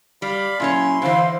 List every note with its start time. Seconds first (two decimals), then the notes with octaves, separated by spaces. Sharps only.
0.22 G3 D5 F5 B5
0.60 A#2 F#3 C#4 E4 C#5 G#5 C6
1.02 D3 E3 C5 F5